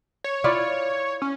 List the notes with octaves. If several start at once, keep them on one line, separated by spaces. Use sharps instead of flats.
C#5
E4 F4 D5
C#4